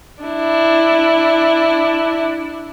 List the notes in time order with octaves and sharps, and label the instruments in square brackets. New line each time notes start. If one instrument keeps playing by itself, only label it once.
[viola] D4 E4